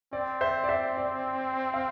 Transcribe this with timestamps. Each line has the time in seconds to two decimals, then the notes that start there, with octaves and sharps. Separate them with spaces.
0.13 C4 D5
0.41 C5 E5
0.64 D5
0.69 C5 E5
0.97 D5
1.74 F5